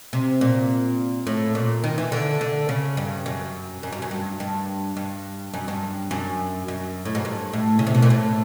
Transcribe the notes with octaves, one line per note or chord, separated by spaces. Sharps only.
C3
A#2
A2
A#2
D#3
E3
D3
D3
C#3
G2
F#2
F#2
G2
F#2
G2
G2
G2
F#2
G2
F#2
F#2
A2
G#2
G2
A2
C#3
C3
B2
A#2
A2